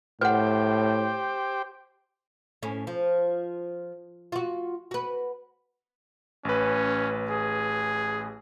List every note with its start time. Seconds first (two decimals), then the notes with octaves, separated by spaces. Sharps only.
0.21 A2 G4 B4 C5 F#5 G5
2.63 A2 C#4
2.87 F3
4.32 F4 F#4
4.91 F#4 B4
6.45 A1 C#4 B4
7.30 G#4